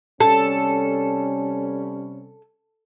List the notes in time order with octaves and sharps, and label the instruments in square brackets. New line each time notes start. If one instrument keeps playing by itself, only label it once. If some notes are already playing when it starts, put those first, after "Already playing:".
[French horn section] C3 G3 C#4 [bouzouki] A4